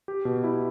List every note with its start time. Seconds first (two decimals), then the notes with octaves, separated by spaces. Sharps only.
0.08 G4
0.25 B2
0.44 E4